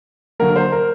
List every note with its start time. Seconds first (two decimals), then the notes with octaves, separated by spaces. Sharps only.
0.39 D3 F#3 A#3 A#4
0.56 C5
0.72 A#4